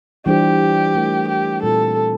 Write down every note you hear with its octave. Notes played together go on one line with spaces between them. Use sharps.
E3 G3 D4 F4 G4 C5
E3 A3 E4 A#4
G4
A#2 G3 C4 F4 A4